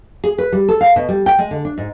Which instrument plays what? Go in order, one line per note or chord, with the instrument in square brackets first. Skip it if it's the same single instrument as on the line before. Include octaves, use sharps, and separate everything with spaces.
[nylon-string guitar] G#4
B4
G3
A4
F5
B2
G3
G5
G#3
D3
D4
G#2